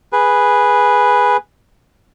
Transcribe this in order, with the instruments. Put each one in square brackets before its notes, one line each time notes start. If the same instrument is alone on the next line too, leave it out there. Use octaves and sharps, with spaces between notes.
[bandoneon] G#4 B4